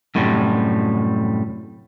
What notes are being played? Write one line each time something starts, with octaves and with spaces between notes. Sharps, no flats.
F#2 A2 C3 G3